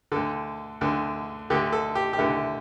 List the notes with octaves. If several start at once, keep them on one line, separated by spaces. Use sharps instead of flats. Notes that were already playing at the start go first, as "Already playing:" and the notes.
D2 D3 A4
D2 D3
D2 D3 G4
A4
G4
G4
D2 D3 E4